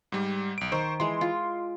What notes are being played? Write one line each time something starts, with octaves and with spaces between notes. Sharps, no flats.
G#2 G3
B1 D7
D#3 C5 C#6
E3 G#3 C6
F4